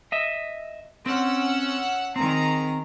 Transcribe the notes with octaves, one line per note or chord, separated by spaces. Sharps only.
D#5 E5
C4 C#4 F#5 E6
D#3 C4 G#4 A#5